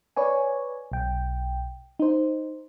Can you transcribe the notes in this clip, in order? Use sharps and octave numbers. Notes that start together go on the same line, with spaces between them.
B4 C#5 D5 G#5
B1 G5
D#4 C5